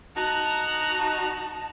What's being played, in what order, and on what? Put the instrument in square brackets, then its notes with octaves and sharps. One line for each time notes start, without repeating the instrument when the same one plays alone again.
[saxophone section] D#4 F#4 [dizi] A5 [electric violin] A#5 F#6